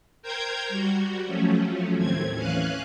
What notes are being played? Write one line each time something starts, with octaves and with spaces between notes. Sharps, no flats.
A#4 C5 G5 A#5 G6 G#6
G3 F#4
F3 F#3 A3 C#4
D#2 A2 C4 G#6
E3 C#4 F5 G#5 F#6